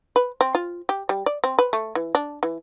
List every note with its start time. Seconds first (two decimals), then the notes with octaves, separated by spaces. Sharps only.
0.16 B4
0.41 C4
0.55 F4
0.89 G4
1.09 G3
1.26 D5
1.44 C4
1.59 B4
1.73 A3
1.95 E3
2.15 D4
2.43 E3